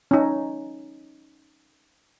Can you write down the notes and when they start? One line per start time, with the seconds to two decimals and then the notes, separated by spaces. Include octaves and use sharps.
0.11 C#4 D#4